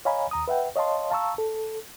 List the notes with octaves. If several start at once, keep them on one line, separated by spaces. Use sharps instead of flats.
C#5 D#5 F5 G#5 A#5 B5
D#2 A#5 D#6
B4 E5 F#5 G5
C#5 D#5 F5 A5 C6
F5 A5 A#5 C#6 E6
A4